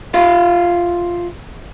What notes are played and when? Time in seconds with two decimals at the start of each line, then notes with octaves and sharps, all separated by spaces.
0.14 F4 E5 F5